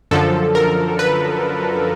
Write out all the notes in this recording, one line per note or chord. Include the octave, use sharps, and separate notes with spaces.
F#2 D3 F3 A4
A#4
B4